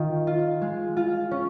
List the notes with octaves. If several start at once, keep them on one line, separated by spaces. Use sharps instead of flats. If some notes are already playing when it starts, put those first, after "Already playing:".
Already playing: D#3 F4
F4
G#3
F4
C#4